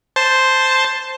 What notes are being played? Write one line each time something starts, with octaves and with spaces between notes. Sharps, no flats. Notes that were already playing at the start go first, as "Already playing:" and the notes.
C5 A5